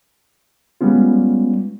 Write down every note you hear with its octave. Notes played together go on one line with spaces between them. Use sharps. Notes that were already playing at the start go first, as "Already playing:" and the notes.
G3 G#3 B3 C#4 F4